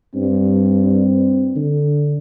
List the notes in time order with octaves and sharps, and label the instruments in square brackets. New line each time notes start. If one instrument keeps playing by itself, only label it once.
[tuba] G2 [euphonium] C4
[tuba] D3